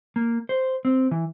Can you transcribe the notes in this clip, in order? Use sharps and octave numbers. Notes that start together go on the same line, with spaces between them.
A#3
C5
C4
E3